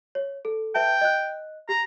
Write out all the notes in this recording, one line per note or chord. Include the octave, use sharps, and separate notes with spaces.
C#5
A4
B4 E5 G5 A5
D#5 F#6
G4 A#5